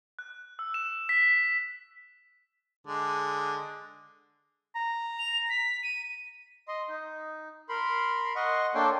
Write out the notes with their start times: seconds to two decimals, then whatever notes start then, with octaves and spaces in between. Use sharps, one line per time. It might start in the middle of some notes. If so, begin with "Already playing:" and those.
0.19 F#6
0.59 E6
0.74 E7
1.09 B6
2.87 D3 G#3
4.75 A#5
5.19 F7
5.50 B6
5.83 D#7
6.68 D#5 C6
6.89 D#4
7.69 A#4 B5 C6
8.36 D#5 F#5 C6 C#6
8.75 A#3 D4 A4 C#5 G5 C6